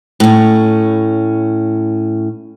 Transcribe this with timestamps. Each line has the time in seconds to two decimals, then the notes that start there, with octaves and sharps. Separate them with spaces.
0.20 A2 C#4